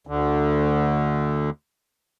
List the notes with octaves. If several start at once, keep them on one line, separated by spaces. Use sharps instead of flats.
D2 D3